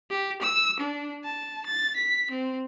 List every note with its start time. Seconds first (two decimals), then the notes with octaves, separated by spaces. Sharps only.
0.11 G4
0.41 E6
0.80 D4
1.24 A5
1.66 A6
1.96 B6
2.31 C4